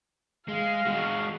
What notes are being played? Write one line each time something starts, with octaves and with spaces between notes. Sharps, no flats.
G#3 F5
G#3 F#4